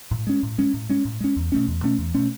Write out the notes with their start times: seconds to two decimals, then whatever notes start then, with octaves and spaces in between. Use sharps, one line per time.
0.11 A2
0.27 G#3 C#4
0.43 A2
0.58 G#3 C#4
0.74 A2
0.89 G#3 C#4
1.05 A2
1.20 G#3 C#4
1.36 E2
1.52 B2 A3 C#4
1.68 E2
1.83 B2 A3 C#4
1.98 E2
2.14 B2 A3 C#4